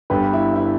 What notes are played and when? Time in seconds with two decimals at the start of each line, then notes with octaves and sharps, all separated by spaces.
0.10 G1 G2 D3 G4 B4
0.33 E4
0.56 E4